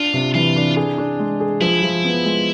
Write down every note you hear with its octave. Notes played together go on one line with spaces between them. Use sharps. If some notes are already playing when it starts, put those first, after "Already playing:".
Already playing: D4 F4
C3
E3 F4
D4
G#4
D4
G#3
G#4
F3 E4
F3
B3
G#3